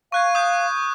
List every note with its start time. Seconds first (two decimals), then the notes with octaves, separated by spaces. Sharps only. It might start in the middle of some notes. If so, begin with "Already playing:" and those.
0.12 F5 C#6 F#6 G#6
0.35 D#6 G6